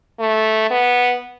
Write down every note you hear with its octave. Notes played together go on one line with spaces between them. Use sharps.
A3
B3